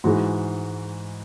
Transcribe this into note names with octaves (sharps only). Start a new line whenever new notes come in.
G#2 E3 G#3 F#4